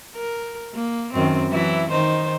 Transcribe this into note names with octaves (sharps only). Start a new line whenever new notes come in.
A#4
A#3
F#2 D#3 C4
E3 F#3 E4
D#3 D#4 C5